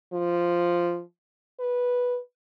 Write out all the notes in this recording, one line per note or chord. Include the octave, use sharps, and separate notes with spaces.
F3
B4